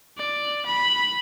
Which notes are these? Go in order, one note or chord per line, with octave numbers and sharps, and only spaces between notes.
D5
B5